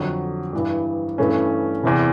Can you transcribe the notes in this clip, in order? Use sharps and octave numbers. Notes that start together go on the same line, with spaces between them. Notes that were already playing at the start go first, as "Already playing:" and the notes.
Already playing: F2 D3 F#3
G2 E3 G3
G2 E3 A3 C#4
E2 C3 E3